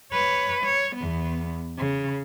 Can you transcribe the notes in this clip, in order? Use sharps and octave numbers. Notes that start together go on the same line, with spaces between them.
B4 C#5
C#5
E2 B3
C#3